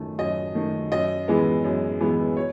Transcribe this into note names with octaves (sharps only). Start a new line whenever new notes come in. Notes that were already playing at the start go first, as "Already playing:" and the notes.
Already playing: F#2 D#3 A3
F#2 D#5
D#3 A3
F#2 D#5
E3 G#3 B3
F#2
E3 G#3 B3
C#5